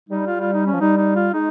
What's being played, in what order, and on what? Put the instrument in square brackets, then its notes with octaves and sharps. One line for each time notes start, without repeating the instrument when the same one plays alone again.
[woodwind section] G3 [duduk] D#4
[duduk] F4
F4
D#4
C#4
[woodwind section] F3
[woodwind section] G3 [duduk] D#4
[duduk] D#4
F4
[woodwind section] G#3 [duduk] D#4